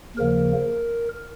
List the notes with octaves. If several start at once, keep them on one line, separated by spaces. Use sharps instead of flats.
D#2 C#3 F3 A#3 A#4